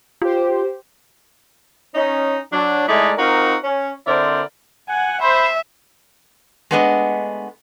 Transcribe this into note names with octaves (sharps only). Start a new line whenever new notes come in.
F4 G4 C5
C#4 D#4
F#3 D4
G#3 A3 D#4 E4 A4 D5
C4 D#4 F4 F#4 A#4
C#4
D3 C4 E4 A#4 C5 D5
F#5 G#5
C5 E5 B5
G#3 A3 B3 D4 C#5 D#5